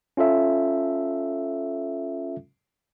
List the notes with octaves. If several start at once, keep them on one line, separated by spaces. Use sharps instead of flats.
C#4 F4 A4 E5